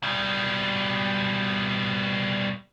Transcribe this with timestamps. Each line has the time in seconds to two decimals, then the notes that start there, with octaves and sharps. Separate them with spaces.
0.03 B2 G3